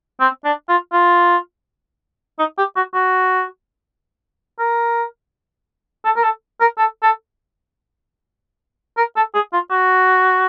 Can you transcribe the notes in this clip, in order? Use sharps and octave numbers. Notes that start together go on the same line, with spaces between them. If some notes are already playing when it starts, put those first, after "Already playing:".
C4
D4
F4
F4
D#4
G4
F#4
F#4
A#4
A4
A#4
A4
A#4
A4
A4
A#4
A4
G#4
F4
F#4